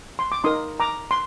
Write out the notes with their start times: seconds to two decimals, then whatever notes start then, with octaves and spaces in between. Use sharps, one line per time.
0.19 C6
0.32 D6
0.44 D#4 A#4 C6 D#6
0.80 A#5 D6
1.11 C6